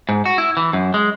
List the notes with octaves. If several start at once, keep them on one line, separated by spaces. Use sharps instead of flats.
G#2
F#4
E4
E3
F#2
G#3